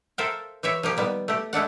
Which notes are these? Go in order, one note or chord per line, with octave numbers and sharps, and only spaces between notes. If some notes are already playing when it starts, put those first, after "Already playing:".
A4 A#4 C5 E5 F5 G5
E3 G4 C#5 E5
F3 A#3 G4
D#3 G3 B3
A3 G4
G#3 A3 D4 F#5